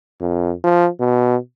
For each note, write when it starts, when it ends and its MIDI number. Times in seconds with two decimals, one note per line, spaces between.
0.21 0.53 41
0.64 0.88 53
1.00 1.36 47